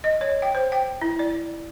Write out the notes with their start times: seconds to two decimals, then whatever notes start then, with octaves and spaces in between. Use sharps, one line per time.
0.04 D#5
0.21 C#5
0.42 G5
0.55 C5
0.72 G5
1.02 E4
1.19 D5